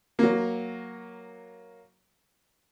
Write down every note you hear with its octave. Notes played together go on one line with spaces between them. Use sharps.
F#3 A#3